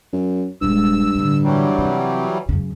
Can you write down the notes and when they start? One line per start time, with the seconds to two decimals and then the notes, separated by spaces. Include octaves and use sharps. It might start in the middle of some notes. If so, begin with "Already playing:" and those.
0.13 F#2
0.61 D#1 G2 G#3 E6
1.15 A2 D3
1.44 E3 F#3 G3
1.78 C3
2.49 F#2 C#3